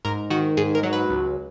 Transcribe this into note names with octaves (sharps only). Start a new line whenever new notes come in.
G#2 A#4
D#3 F#4
G#2 G#4
A#4
F#3
B4
C#2